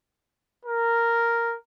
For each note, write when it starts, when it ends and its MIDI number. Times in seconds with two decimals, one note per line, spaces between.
0.65 1.55 70